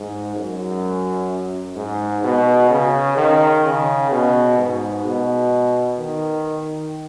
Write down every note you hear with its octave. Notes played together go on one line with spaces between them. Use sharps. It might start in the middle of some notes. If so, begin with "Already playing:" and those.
Already playing: G#2
F#2
G#2
B2
C#3
D#3
C#3
B2
G#2
B2
D#3